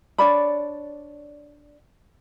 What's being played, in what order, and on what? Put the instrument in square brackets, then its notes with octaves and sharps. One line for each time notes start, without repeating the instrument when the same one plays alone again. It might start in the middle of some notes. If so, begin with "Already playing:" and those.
[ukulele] D4 C#5 D5 B5